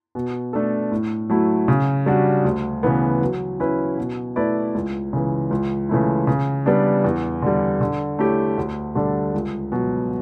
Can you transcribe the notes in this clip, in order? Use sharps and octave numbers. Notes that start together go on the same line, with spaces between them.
B2
A3 D4 A4
A2
F#3 A3 E4
C#3
G3 D4 F#4
D2
C#3 E3 B3
F#3
C#4 E4 B4
B2
A3 E4 B4 D5
C#2
C#3 E3
C#2
C#3 E3 A3 E4
C#3
G3 B3 D4
E2
D3 G3
D3
A3 E4 G4 C#5
D2
D3 G3 D4 A4
C#2
B2 F#3